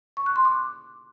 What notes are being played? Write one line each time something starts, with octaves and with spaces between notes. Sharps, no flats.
C#6
F#6
C6
D6